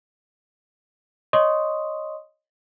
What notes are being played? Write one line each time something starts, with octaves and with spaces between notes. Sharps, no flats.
C#5 D#5 C6 C#6 D#6